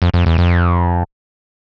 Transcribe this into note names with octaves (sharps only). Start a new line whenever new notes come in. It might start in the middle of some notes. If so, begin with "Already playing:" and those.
F2
F2
E2
F2